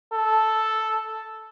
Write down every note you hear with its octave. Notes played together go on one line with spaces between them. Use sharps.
A4